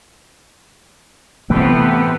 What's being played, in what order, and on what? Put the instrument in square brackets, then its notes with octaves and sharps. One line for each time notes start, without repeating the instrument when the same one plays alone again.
[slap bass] A2 E3 A3 [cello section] C3 B3 [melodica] A4 B4 G5